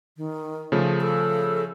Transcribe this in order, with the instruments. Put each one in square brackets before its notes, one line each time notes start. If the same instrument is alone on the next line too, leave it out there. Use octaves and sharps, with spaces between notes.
[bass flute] D#3
[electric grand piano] C#3 F3 A3
[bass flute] A4